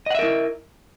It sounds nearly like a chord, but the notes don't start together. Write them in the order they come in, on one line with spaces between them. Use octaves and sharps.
D#5 F#5 E5 A#4 E4